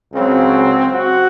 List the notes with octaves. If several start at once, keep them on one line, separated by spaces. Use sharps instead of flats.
C#2 C#3 F#3 C4
F#4